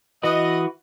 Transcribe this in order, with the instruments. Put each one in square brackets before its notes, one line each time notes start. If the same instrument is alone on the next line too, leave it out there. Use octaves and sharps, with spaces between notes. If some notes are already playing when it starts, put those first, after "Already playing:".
[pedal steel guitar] E3 F#4 B4 [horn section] D#5